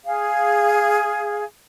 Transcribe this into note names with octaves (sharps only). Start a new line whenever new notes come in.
G#4 F5